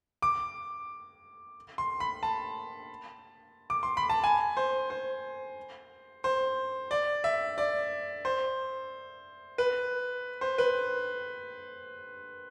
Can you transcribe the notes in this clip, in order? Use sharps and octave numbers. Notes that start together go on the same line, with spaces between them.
D6
C6
B5
A5
D6
C6
B5
A5
G#5
C5
C5
C5
D5
E5
D5
C5
B4
C5
B4